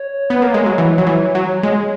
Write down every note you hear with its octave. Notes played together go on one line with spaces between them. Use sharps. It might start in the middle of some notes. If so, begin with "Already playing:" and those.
Already playing: C#5
B3
A#3
G#3
F#3
E3
F#3
E3
F#3
G#3